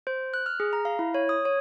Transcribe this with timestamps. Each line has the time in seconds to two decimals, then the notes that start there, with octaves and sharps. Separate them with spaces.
0.07 C5
0.34 F#6
0.46 F6
0.60 G#4
0.73 A#5
0.85 F5
0.99 E4
1.14 C#5
1.29 D#6
1.45 C#5